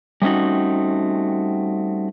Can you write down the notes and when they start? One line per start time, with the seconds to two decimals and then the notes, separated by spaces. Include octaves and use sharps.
0.22 G3 A3 C4 C#4 D#4 F#4